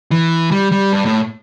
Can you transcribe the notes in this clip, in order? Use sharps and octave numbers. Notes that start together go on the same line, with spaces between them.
E3
G3
G3
G2
A2